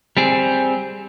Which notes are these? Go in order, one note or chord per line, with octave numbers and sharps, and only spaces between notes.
G3 C4 G#4